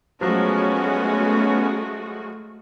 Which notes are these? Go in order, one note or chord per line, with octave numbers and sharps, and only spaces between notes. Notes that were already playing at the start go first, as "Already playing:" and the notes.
F3 F#3 G#3 A3 B3 C#4 F#4